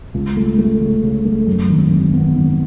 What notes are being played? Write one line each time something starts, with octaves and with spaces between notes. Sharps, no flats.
C#2
A3
A3
C#3
C#3
A3
F#2
G#1
G#1
B3
G#1